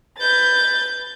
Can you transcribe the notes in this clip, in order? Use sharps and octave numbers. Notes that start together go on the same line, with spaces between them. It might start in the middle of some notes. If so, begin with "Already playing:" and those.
B4 G6 A6